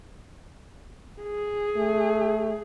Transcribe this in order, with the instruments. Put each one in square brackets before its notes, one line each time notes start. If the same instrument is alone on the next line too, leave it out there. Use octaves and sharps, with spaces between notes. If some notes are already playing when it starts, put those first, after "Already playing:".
[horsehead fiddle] G#4
[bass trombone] A3